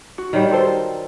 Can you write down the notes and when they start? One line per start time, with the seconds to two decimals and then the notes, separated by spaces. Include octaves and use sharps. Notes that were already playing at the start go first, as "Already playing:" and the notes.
0.18 F#4
0.33 D#3 F#3 G3
0.51 F4 A4 C5